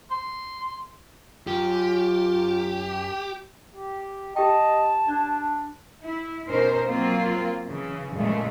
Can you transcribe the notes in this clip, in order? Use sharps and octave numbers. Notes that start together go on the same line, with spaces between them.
C6
F#2 F4 G4
G4
G4 D#5 G5 A5
D4 D5
E4
B2 C#4 D#4 A#4 C5
F#3 A#3 C4 F4
C#3 E3
F#2 A#2 C#3 E3 G#3 A3